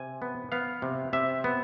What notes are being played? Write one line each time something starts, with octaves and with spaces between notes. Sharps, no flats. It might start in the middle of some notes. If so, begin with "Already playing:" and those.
Already playing: C3 G#5
B3
B3 F5
C3
C3 E5
B3